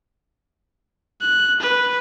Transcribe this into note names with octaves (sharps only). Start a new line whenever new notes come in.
F#6
B4